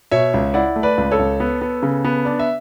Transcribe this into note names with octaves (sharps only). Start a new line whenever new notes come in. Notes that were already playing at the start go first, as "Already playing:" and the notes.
B2 C#5 E5
C#2
E4 D5 F#5
A3
B4 D5
C#2
A4 C#5
C#2
B3
B3
C#3
B3
D4 D5
E5